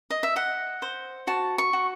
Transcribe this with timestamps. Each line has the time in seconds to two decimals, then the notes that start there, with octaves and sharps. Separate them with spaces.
0.10 D#5
0.23 E5
0.36 D#5 F#5
0.82 C5
1.27 F#4 A5
1.58 C#6
1.73 F#4